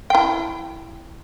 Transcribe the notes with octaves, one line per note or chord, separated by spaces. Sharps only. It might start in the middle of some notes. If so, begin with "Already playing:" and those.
E4 G5